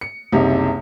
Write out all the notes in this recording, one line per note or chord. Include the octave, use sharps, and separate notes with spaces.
C#7
F#1 C2 C3 D#4